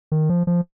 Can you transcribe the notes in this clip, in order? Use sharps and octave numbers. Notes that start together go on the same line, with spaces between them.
D#3
F3
F3